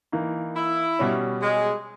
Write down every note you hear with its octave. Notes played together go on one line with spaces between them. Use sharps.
E3 A#3 D#4
E4
B2 G3 C#4
G#3